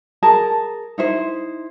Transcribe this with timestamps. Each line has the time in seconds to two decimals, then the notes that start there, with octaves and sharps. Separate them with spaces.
0.23 G#4 A#4 A5
0.98 D#4 E4 C5